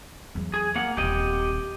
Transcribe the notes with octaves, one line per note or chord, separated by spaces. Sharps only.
E2 F#3
G#4
A#3 F#5
D#1 C4 G4 D#5